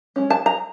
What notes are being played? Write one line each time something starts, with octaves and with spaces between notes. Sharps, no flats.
G#3 C#4
A5
A#5